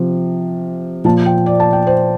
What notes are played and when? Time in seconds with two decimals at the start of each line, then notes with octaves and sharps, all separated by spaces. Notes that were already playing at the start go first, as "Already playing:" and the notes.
Already playing: C3 F3
1.05 A#2 F3 A5
1.26 G5
1.46 D5
1.60 A5
1.73 G5
1.87 C5